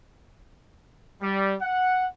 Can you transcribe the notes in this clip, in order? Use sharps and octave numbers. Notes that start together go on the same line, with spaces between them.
G3
F#5